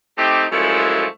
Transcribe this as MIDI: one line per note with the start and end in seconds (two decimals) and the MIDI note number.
0.18 0.45 57
0.18 0.45 60
0.18 0.45 63
0.18 0.45 67
0.51 1.06 42
0.51 1.06 53
0.51 1.06 56
0.51 1.06 57
0.51 1.06 64